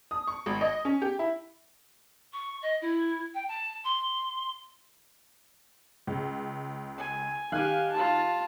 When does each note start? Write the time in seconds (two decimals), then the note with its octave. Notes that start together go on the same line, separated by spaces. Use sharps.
0.11 D#6
0.27 C#6
0.46 G#1
0.61 D#5
0.85 C#4
1.02 G4
1.19 E4
2.33 C#6
2.62 D#5
2.81 E4
3.34 G5
3.48 A5
3.84 C6
6.07 C#2
6.98 G#5
7.52 D#3 G4 F5 G#5 F#6
7.92 F4 A5